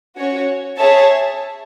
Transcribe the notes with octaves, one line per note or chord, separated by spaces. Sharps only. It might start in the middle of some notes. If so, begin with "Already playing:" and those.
C#4 F#4 C#5
G#4 C#5 E5 A5